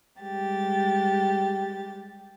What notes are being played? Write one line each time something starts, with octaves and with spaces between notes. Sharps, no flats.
G3 G#3 G4 A6